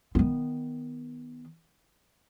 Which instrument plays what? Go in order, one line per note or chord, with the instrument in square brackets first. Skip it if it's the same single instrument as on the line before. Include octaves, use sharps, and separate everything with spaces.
[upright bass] D#3 B3